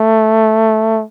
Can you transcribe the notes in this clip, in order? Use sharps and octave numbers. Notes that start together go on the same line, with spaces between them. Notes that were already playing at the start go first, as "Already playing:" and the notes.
Already playing: A3